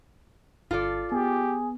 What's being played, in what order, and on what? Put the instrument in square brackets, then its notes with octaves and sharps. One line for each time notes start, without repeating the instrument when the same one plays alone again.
[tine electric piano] G1 [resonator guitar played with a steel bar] F4 A4 D5
[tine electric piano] B3 [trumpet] G4 [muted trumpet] G#4